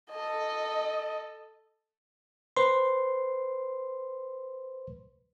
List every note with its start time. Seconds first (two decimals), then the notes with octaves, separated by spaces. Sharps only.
0.11 A4 D#5
2.57 B4 C5 C6